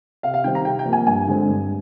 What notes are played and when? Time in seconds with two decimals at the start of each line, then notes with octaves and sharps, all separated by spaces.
0.23 C3 F5
0.34 F5
0.44 D#3 G3 C4 G5
0.55 A#5
0.65 C3 G5
0.79 G5
0.86 F3 A#3
0.93 G#5
1.07 G2 G#5
1.27 D3 G#3 C4
1.48 G2